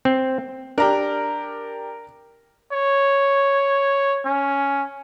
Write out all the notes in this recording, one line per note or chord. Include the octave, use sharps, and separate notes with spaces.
C4
D4 G4 A#4 A#5
C#5
C#4